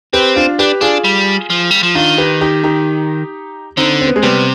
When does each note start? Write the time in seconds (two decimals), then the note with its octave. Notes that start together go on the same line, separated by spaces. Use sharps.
0.13 C4 G4 B4
0.36 D4 F4
0.59 D4 G4 B4
0.81 D4 F4 G#4
1.04 G3
1.50 F3
1.71 G3
1.83 F3
1.95 D#3 D4 F4
2.18 G4 B4
2.41 D#4 G4
2.63 D#4 G4
3.77 D3 C4 D#4
4.01 C4
4.07 B3
4.15 G#3 C4
4.23 C3 G3 B3